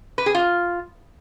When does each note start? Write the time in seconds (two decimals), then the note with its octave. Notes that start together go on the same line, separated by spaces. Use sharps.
0.18 B4
0.26 G#4
0.35 F4